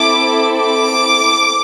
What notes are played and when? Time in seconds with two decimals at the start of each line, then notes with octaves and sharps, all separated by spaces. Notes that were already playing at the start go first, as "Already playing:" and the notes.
Already playing: C4 E4 A4 D6
0.56 D6